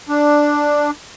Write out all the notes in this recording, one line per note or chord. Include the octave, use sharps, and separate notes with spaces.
D4